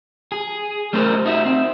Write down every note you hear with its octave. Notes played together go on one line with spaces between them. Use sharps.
G#4
G3 A3 C#4 A#4 C5
D#4 F#4 E5
C4